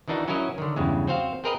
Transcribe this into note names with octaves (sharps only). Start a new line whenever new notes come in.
D#3 E3 D4 D#4 F#4
F#3 C#4 E4 F#4 A#4 D#5
D3 D#3
E2 G2 C#3 G#3
C4 F#4 C5 F5
C4 G#4 A#4 B4 D#5